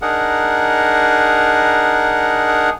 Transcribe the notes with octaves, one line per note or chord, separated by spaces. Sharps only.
D4 D#4 G#4 A#4 F#5